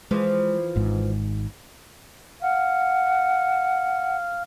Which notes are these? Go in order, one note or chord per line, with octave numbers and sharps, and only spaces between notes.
E3 F3 G#3
G#1 G#2
F5 F#5